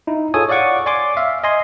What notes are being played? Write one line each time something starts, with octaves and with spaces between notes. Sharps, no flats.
D#4 E4
F4 G#4 A4 C#5 G#5 D#6
C#5 D5 F5 F#5 C#6 D6
D5 G#5 C6 D6
E5 F5
D#5 G#5 C6